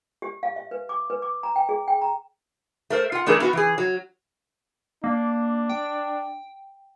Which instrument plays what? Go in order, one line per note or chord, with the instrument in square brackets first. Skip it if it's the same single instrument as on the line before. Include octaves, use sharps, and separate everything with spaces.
[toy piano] G4
F5
E5
B4
D6
B4
D6
A#5
G5
G#4
G5
A#5
[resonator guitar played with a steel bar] A3 A#4 C5
F4 F#5
E3 A3 D4 G#4 A#4
B3 E4 F#4
E3 G#4
F#3
[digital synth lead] A#3 [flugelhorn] D4
[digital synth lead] G5